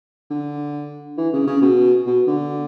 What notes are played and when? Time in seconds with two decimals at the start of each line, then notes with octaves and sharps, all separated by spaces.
0.31 D3
1.18 E3
1.33 C#3
1.47 C#3
1.62 B2
2.06 B2
2.27 D3